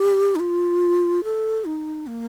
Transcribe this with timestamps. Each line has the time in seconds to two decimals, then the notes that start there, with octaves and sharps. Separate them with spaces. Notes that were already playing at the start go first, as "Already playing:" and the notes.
Already playing: G4
0.36 D#4
0.40 F4
1.24 A4
1.65 D#4
2.07 A#3